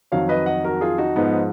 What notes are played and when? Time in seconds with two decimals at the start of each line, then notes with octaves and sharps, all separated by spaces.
0.12 F2 D#3 F#3 C#5 F5
0.29 B4 D#5
0.46 D#5 F#5
0.64 F#4 A#4
0.81 F4 G#4
0.98 D#4 F#4
1.16 G#2 F3 B3 D#4